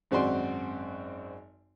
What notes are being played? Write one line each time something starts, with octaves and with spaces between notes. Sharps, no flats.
G#1 F#2 C4 F#4 D5 C6